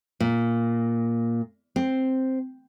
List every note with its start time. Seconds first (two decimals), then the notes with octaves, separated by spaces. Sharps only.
0.20 A#2
1.76 C4